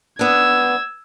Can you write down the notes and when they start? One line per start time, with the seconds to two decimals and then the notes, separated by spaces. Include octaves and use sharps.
0.19 B3 D4 E6 G#6